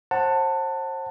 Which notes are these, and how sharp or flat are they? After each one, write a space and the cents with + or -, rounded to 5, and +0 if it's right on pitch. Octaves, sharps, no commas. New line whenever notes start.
C5 +35 F#5 +0 A5 +20